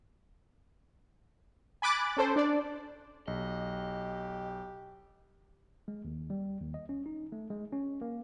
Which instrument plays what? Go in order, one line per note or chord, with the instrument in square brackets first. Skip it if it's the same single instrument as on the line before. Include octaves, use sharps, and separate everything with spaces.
[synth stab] G#5 B5 D6 F#6 A6
C#4 A4 C5
D4 D5
[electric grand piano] B1 [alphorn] G4 [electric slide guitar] D#5
[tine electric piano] G#3
D#2
G3
D#2
D#5
C#4
D#4
A3
G#3
C#4
A#3